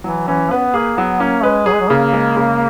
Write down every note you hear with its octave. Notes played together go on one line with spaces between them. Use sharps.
E3 F#3
E3 C#4
B3 B4
A#3 G#4
F#3 B3
A#3 C#4
G#3 B4
F#3 G#4
G#3
F#3
C#3 A#3
G#3
C#3